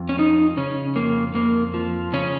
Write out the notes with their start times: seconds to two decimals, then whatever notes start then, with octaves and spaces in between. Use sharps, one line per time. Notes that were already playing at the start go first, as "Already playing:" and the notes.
Already playing: F2
0.09 C#4
0.18 F3 D#4
0.57 C#3 C#4
0.96 F2 A#3
1.35 F2 A#3
1.74 F3
2.13 C#3 C#4